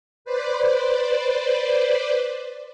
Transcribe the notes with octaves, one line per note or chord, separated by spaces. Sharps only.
B4 C5 D5